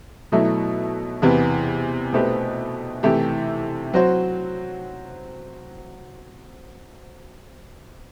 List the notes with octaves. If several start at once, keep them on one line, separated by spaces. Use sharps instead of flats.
B2 F#3 A3 E4
E2 C3 E3 B3
B2 A3 C4 G4 B4
C3 E3 A3 E4 G4
F#3 C4 F#4 C5